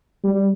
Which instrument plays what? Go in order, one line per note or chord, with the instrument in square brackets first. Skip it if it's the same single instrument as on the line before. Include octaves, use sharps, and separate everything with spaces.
[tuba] G3